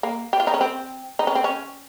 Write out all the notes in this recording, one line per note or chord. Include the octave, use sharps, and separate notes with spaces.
A#3
G4
F4
D#4
C#4
C4
D#4
C#4
C4
C#4